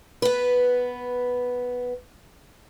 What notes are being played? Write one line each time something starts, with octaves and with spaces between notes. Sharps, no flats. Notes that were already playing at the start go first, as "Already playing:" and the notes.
B3 B4